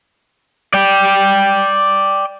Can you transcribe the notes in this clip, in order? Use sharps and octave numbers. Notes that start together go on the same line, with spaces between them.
D5 G5